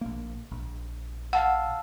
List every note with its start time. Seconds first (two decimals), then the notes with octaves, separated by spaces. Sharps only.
0.01 A#1 A#3
0.52 A#1
1.33 F5 F#5 A5 E6